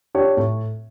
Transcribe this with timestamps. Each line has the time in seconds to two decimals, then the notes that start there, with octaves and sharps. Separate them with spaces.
0.15 D4 G4 C#5
0.37 A2